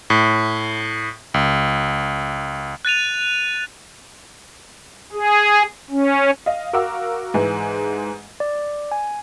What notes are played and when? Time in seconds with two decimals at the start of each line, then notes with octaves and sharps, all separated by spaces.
0.10 A2
1.34 C#2
2.85 F#6 A6 D#7 F7
5.13 G#4
5.90 C#4
6.46 D#5 F5
6.73 F#4 A#4 F5 F#5 D6 E6
7.34 G#2 E3 G#3
8.40 D5
8.92 G#5